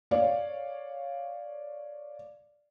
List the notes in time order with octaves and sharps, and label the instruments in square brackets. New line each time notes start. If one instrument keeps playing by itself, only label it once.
[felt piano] C#5 D5 F5